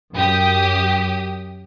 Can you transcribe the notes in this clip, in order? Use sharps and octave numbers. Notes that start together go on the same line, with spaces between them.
F#2 G4 D#6